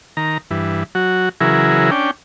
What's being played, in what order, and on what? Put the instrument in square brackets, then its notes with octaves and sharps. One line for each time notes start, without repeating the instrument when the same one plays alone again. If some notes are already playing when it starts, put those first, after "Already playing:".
[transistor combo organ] D#3 A#5
G2 E3
F#3 F#4
C#3 E3 F#3 E4 G#4 A#4
C#4 D4 G5